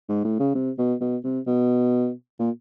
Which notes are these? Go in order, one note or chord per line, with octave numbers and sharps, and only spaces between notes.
G#2
A2
C#3
C3
B2
B2
C3
B2
A#2